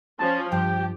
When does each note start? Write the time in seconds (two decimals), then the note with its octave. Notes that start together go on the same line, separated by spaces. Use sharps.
0.19 F3 C#4 A5
0.52 G2 F3 G4 G5